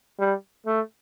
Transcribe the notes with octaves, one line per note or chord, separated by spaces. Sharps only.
G3
A3